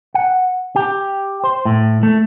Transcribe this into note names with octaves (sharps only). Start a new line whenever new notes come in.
F#5
G4
C5
A2
A3